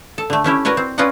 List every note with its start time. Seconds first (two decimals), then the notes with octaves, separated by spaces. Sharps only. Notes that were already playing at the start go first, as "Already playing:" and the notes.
0.18 A4
0.30 D3 A3
0.44 A3 C#4 E4 G4
0.65 F#4 A#4 B4 C#5 D5
0.77 C4
0.98 C#4 F4 B4 D5 D#5 F#5